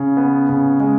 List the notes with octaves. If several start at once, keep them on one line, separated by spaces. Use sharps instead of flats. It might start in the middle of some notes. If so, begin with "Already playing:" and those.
Already playing: C#3
B3
C#3
G#3